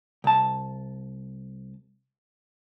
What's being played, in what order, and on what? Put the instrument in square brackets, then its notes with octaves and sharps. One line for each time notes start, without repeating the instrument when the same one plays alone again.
[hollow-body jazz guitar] C2 A5